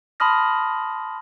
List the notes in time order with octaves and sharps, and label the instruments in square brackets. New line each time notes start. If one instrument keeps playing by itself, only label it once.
[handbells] A5 B5 C6 D#6 F6 A#6